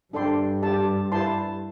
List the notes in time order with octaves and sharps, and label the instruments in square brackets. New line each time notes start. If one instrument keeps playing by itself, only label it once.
[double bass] G2 [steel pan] D4 A4 D5 G5 C6
[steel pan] G4 D5 A5
E4 B4 D5 A5 C6